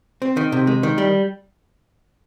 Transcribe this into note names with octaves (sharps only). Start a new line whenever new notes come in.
C4
D#3
C3
G#3
D#3
G3